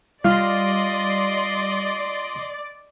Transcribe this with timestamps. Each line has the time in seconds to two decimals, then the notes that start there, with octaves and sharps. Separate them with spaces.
0.25 G3 F4 D5 D#5 C6